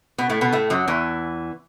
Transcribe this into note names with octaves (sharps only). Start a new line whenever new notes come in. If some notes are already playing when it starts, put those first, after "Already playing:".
B2 B3
A2 A3
B2 B3
A2 A3
F#2 F#3
E2 E3